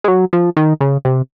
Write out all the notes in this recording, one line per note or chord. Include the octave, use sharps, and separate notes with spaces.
G#3
F#3
F3
D#3
C#3
C3